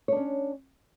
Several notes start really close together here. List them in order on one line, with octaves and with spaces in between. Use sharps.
C#5 D4 C#4